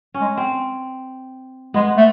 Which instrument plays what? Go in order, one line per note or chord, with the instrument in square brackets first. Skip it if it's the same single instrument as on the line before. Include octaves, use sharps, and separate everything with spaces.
[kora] C#4
[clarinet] G#3
[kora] C4
[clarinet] G#3 [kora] B3
[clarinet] A3